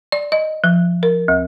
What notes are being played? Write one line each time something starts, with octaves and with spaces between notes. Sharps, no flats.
D5
D#5
F3
A#4
D2